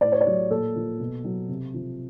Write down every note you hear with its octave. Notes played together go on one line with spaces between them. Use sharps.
A2 D5
C#5
D5
F#3
A#2 A4
F3
B2
F#3
C3
F3